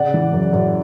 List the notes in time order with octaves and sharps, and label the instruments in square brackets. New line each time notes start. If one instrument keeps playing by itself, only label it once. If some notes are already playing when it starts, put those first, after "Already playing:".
Already playing: [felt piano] C#3 D5 F#5
E3
F#2
F#2